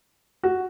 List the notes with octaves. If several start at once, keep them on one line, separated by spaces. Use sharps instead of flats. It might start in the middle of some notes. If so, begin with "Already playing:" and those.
F#4